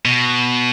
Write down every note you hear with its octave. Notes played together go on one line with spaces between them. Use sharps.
B2